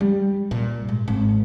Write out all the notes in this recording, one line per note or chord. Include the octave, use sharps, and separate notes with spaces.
G3
A#2
G#2
G#1